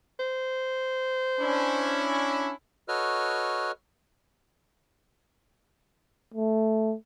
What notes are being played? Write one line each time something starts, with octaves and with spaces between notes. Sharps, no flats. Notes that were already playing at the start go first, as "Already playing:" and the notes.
C5
C#4 D4 E4
F#4 A4 B4 C#5 D#5 F6
A3